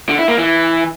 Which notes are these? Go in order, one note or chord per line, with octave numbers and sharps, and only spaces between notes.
D3
E4
A#3
E3